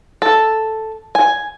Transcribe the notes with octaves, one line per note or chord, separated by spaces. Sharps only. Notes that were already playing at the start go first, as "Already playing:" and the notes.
A4
G#5